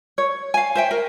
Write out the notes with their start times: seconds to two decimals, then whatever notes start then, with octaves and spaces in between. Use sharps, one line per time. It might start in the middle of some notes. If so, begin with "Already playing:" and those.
0.18 C#5
0.54 F5 G#5
0.75 C5 E5 G5
0.91 A#4